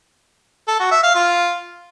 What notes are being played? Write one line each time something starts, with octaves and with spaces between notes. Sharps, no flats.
A4
F#4
E5
F5
F4